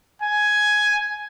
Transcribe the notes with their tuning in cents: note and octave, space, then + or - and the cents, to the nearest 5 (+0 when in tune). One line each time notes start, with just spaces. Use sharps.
G#5 +10